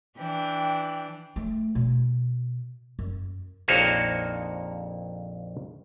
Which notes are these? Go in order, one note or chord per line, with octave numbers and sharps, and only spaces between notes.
E3 D4 G5
A3
B2
F#2
A#1 F2 A#3 D#4 F#4 C#5